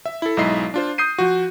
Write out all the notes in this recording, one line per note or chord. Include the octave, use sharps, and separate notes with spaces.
E5
E4 A4
B1 G#2 E4 D#5 E5 C7
D4 F4 C5
D#6 G6 C7 D#7
F3 F#4